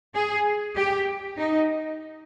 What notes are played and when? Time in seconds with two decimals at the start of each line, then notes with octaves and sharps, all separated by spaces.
0.14 G#4
0.76 G4
1.37 D#4